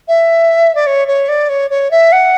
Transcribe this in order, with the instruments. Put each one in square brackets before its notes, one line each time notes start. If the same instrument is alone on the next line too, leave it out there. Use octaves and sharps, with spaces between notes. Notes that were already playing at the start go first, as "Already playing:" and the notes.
[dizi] E5
D5
C#5
C#5
D5
C#5
C#5
E5
F#5